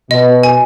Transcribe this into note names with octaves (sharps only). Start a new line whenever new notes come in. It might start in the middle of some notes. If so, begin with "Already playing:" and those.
B2 D#5
G#5